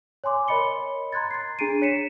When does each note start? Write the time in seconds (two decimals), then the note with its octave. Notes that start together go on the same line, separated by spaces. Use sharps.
0.24 C#5 G#5 C6 D6
0.48 A#4 C#5 D#5 B5 C#7 G7
1.12 A#5 C6 F#6 G#6 A6
1.31 A6 C7
1.59 D4 G#4 A#5 C7 D7 D#7
1.82 C#5 B6 C#7 D#7 E7